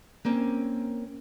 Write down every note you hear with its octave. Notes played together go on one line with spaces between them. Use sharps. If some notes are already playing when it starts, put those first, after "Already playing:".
A#3 C4 C#4